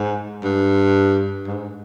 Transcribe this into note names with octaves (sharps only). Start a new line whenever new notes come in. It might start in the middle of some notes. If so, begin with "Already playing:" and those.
Already playing: G#2
G2
G#2